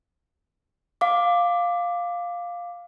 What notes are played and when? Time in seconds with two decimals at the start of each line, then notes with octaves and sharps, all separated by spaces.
1.01 F5 D6